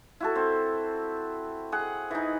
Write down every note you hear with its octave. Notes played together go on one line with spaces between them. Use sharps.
E4 F#4 A4
C4
G#4 F#5
E3 D#4